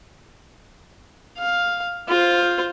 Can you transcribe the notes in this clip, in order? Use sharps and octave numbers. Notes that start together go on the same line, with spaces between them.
F5
F4 C5